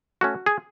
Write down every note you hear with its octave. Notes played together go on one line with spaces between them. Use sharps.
A3 C#4 F#4
G#4